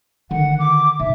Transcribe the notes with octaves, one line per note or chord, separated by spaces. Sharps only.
D3 D#3 F#5
D6
B1 E5